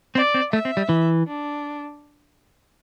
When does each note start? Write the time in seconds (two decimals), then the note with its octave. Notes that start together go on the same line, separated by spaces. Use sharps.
0.15 C4 D5
0.34 C4
0.53 A3 E5
0.65 C4
0.77 G3
0.89 E3
1.26 D4